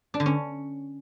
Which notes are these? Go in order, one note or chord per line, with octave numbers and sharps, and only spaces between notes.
D4
D3
C#4